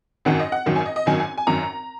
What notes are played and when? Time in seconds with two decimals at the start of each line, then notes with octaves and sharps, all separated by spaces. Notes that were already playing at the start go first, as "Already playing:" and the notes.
0.25 G#1 F#2 D#3 F#3 F#5
0.39 D#5
0.52 F#5
0.66 G#1 F#2 D#3 F#3
0.76 G#5
0.86 D#5
0.96 D#5
1.06 G#1 F#2 D#3 F#3 G#5
1.20 G#5
1.38 G#5
1.47 G#1 F#2 D#3 F#3 A#5